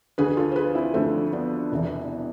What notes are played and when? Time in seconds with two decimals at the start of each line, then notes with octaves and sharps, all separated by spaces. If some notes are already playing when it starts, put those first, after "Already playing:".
0.18 D2 D3 G#4 B4
0.28 G#4
0.37 F4 A4
0.52 C5
0.56 G#4 B4
0.75 C4 E4
0.94 D2 D3 A3 C4
1.33 B3 D4
1.72 E1 E2 C3 E3